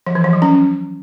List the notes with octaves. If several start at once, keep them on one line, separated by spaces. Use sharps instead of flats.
F3
E3
F3
F#3
C#4